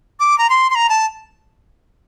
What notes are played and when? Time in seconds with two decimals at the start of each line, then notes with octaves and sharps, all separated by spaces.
0.20 D6
0.38 A#5
0.50 C6
0.70 C6
0.75 A#5
0.89 A5